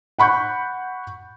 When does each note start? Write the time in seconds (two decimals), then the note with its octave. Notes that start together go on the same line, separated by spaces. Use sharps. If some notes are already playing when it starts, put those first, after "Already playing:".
0.19 F#5 B5 C#6 F#6 G6